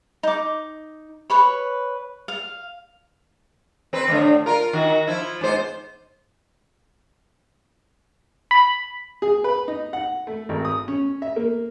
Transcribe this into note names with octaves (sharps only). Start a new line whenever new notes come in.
D#4 D6
B4 C#5 B5
F5
C4 B4
F2 A2 D3
F4 A#4
D#3 F#4
F3 E4
G#2 B3 C5
B5
G#4
B4
D#4
F#5
A3
G#1
D#6
C#4
E5
A#3